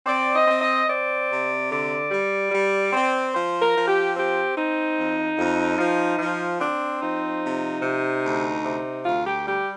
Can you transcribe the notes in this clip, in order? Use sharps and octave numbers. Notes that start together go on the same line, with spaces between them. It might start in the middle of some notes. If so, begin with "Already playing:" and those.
C4 D5
D#5
C4
D#5
C4 D5
C3
D3 D5
G3
G3
C4
F3 C5
A#4
F3
G4
C4 G4
C4 D#4
F2
F2
F3
F3
C4 D4
F3 D#4
C3
C3
D2
C3
D2 F4
G4
G3 G4